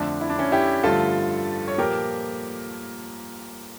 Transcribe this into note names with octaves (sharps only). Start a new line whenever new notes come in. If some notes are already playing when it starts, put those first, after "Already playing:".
Already playing: F2 D3 A3 D4
E4
D4
C#4 E4
E4 G4
G2 D3 F3 A3 F4 A4
C#5
A#2 F3 A#3 G4 A#4